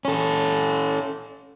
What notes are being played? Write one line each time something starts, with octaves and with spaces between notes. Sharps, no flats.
C#4 A4